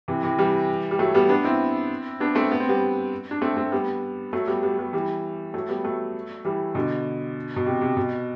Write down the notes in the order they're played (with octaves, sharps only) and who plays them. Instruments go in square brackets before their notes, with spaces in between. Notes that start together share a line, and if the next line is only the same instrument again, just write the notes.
[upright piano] C3 E3
C3 E3
E3 G3
G3
F#3 A3
G3 B3
B3 D4
C4 E4
B3 D4
A3 C4
B3
C4
G3 B3
D4
A3 C4
A3 C4
G3 B3
F#3 A3
G3 B3
G3 B3
G3 B3
E3 G3
F#3 A3
G3 B3
F#3 A3
E3 G3
B2 D3
B2
C3
C3
B2